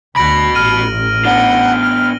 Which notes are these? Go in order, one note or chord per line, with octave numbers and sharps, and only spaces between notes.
D2 F#4 B5 A#6 D7 F#7
A1 F6 D#7
B3 D4 F#5 G7
F6